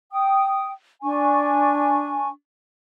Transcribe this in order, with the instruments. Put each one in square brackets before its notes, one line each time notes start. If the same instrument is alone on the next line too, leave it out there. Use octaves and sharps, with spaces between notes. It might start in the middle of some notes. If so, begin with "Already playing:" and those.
[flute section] G5 D#6
D4 G#5 C#6